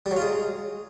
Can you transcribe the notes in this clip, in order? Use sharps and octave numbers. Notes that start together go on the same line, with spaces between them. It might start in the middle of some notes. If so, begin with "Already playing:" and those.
G3
F#3
F4
G#3